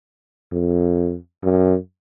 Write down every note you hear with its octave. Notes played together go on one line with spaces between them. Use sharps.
F2
F#2